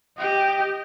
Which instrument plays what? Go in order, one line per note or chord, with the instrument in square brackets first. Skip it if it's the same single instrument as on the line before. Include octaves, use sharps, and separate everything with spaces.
[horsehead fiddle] G4 D#5